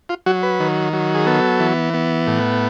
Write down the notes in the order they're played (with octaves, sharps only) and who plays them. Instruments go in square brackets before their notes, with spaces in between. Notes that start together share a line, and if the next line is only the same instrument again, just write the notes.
[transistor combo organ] F4
F#3 F#4
B4
D#3
F#3
G#4
B3 A4
E3
B3
A2